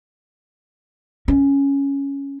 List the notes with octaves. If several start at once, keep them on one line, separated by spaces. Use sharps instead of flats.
C#4